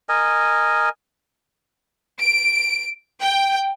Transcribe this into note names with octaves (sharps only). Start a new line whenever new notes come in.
A#4 D#5 G#5
D7
G5